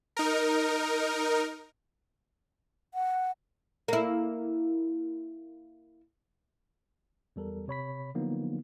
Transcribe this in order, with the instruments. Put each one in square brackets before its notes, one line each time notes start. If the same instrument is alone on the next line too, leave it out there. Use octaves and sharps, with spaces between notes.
[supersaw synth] D#4 A#4
[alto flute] F#5
[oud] A#3 E4
[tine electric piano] E2 G3 A4 A#4
C3 C#5 B5 B6
D3 F3 F#3 A#3 B3 D#4